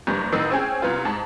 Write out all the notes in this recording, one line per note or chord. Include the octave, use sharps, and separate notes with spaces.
F#1 G2
A1 D#3 D#4 B4 E6 C7
C4 C#4 G#4 G5
C2 B3 F4
G#2 A5